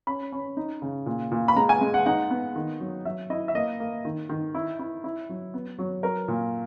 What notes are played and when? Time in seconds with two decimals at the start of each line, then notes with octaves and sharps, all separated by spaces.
0.07 C#4 B5
0.32 C#4
0.57 D#4
0.82 C#3
1.06 A#2
1.32 A#2
1.48 B5
1.56 G#3 A#5
1.69 G#5
1.81 G#3
1.94 F#5
2.06 D#4 F#5
2.30 B3
2.56 D#3
2.80 F#3
3.05 F#3 E5
3.30 E4 D#5
3.48 E5
3.55 A#3 D#5
3.80 A#3
4.05 D#3
4.29 D#3
4.55 E4
4.79 E4
5.04 E4
5.29 F#3
5.54 B3
5.79 F#3
6.03 F#3 A#4
6.28 A#2